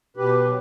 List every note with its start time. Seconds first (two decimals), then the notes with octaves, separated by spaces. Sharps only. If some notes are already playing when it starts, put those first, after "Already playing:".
0.17 B2 G4 B4
0.45 F#3